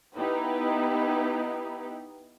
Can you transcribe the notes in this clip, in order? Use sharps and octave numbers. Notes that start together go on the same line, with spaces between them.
B3 D#4 E4 G4 B4